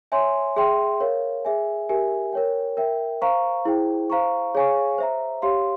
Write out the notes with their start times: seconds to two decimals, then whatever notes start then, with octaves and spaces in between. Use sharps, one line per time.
0.12 C#5 E5 G#5 C6
0.56 G#4 E5 G5 C6
1.00 A#4 C#5 F5
1.45 G#4 E5 G#5
1.89 G4 A#4 E5 G#5
2.33 A#4 C#5 G5
2.77 A#4 E5 G5
3.22 C5 F5 A#5 C#6
3.65 E4 G#4 C5 G5
4.10 C5 F5 A#5 C#6
4.54 G#4 C#5 F5 G#5 C#6
4.98 C5 E5 A#5
5.42 G4 C#5 F5 C6